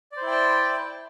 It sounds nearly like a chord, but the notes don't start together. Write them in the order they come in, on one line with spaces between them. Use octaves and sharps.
D5 C5 E4 G5 A5